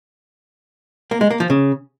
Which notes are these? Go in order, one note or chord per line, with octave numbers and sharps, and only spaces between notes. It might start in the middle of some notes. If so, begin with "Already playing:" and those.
A#3
G#3
A#3
F3
C#3